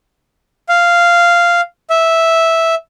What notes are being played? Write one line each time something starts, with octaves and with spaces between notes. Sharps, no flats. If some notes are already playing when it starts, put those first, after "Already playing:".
F5
E5